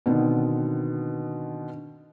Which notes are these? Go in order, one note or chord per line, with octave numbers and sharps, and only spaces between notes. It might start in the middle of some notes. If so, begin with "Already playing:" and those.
B2 D3 D#3 B3 C4